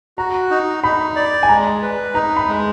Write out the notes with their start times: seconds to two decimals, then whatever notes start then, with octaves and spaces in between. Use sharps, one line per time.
0.18 F#4 A#5
0.51 D#4
0.84 D#4 B5
1.16 D5
1.43 G#5
1.49 G#3 A#5
1.82 B4
2.15 D#4 A#5
2.36 B5
2.47 G#3